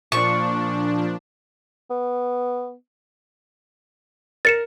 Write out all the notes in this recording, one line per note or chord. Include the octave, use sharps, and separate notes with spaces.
A#2 F3 D4 C#6
B3
A#4 A6 C#7 E7